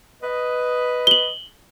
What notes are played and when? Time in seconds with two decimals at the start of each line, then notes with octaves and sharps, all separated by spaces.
0.22 B4 D#5
1.07 F#7 G7